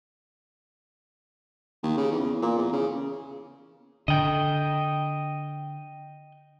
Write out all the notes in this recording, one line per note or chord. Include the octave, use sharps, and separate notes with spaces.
D#2
C#3
E2
A#2
E2
C#3
D3 D#5 G5